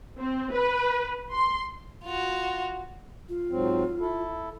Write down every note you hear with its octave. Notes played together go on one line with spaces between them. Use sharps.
C4
B4
C6
F4 F#4
F4
G#2 F#3 C4
E4 A4